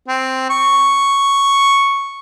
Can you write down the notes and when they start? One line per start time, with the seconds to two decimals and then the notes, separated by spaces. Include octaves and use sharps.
0.08 C4
0.50 C#6